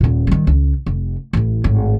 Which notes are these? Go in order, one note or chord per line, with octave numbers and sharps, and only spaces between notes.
D#1 A#2
D#3 G3
C#2
F1
A1 A2
G#1 A2